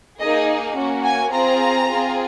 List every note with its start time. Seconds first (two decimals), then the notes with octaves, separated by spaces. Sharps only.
0.20 A#3 D#4 G#4 D#5
0.76 A#3 C#4 F#4
1.04 G#5
1.31 C4 F4 G#4 A#5
1.89 C4 F4 G#4